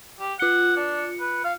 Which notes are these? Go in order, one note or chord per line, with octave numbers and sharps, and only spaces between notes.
G4
F4 F#5 C#7
D4
B4
F5